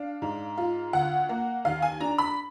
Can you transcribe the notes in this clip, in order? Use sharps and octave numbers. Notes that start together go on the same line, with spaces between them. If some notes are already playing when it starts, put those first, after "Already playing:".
Already playing: D4 F5
G#2
F4
D2 F#5
A#3
D#2 F5
G#5
D4 A#5
B5